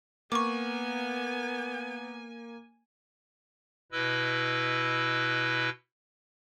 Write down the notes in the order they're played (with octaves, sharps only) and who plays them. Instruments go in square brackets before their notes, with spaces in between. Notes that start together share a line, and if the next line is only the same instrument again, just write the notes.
[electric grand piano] A#3 [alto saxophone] B3 [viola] G#5 [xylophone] C#6 D6
[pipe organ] B2 E4 B4 D#5 E6